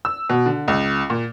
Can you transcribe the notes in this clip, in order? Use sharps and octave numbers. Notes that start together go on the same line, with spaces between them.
E6
B2
D3
C#2
A#2